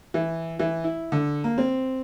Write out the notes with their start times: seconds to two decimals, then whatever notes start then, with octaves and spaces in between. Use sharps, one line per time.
0.14 E3
0.59 E3
0.84 E4
1.12 D3
1.44 A#3
1.58 C4